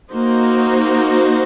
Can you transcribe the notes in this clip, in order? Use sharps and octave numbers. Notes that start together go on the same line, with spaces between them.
A#3 D#4 F#4 C5